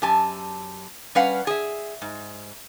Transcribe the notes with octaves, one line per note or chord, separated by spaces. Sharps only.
F#2 G4 G#5 A5
G3 C#4 B4 F5 F#5
G#4 E5
G#2